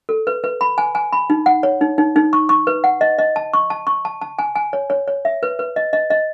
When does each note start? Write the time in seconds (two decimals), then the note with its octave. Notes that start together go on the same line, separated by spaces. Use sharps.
0.09 A4
0.27 B4
0.44 B4
0.61 B5
0.78 G#5
0.95 G#5
1.13 B5
1.30 D#4
1.46 F#5
1.63 C#5
1.81 D#4
1.98 D#4
2.16 D#4
2.33 C#6
2.49 C#6
2.67 B4
2.84 F#5
3.01 D#5
3.19 D#5
3.36 A5
3.54 C#6
3.70 A5
3.87 C#6
4.05 A5
4.21 A5
4.39 G#5
4.55 G#5
4.73 C#5
4.90 C#5
5.08 C#5
5.25 E5
5.43 B4
5.59 B4
5.76 D#5
5.93 D#5
6.10 D#5